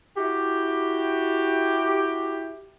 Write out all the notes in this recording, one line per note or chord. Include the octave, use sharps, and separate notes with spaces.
E4 F#4 G4